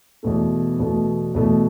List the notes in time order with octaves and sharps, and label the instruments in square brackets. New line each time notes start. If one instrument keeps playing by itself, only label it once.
[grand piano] E2 B2 A3
E2 B2 A3
E2 B2 A3